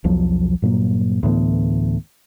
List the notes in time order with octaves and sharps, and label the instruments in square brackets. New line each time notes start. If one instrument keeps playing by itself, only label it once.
[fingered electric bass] B1 E2 F3 F#3
G2 A#2 F#3 A#3
D2 A2 E3 B3